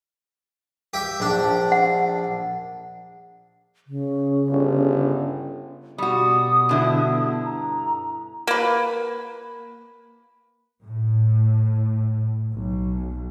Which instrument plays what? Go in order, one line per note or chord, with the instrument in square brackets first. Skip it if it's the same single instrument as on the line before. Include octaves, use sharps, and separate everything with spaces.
[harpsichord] G4 E5
A#1 D4
[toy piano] F#5
[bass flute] C#3
[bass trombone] G1
[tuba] B2 [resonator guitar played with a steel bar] G3 F#4 [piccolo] D#6
[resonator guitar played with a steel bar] G2 D3 E4
[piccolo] A#5
[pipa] A#3 B4
[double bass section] A2
B1